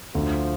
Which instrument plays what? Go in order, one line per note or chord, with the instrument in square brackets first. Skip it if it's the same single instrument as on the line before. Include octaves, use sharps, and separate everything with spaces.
[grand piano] D2 [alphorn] F3